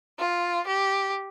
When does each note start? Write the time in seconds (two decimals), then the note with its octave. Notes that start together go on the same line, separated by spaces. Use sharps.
0.18 F4
0.67 G4